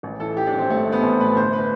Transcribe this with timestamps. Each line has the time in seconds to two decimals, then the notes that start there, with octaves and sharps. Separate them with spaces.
0.03 A1
0.20 E3 A4
0.36 E3 G4
0.47 D4
0.53 A1
0.58 C4
0.69 A1 A3
0.87 A1
0.92 B3
1.02 A1 C4
1.20 A2 B4
1.36 G1 C5
1.53 B4